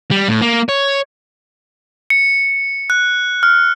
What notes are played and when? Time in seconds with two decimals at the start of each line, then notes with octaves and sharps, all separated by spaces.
0.11 G3
0.28 A2
0.42 A#3
0.69 C#5
2.10 C#7
2.90 F#6
3.43 F6